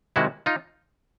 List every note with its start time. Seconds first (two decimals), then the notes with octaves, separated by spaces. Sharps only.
0.16 C3 D#3 G#3 E4 F#4
0.46 D#4 F4